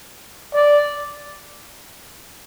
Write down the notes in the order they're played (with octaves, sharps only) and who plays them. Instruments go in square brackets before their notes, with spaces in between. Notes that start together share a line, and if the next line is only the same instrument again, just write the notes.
[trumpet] D5